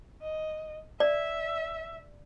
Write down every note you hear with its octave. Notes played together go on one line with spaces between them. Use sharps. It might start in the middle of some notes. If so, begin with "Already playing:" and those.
D#5
D5 E5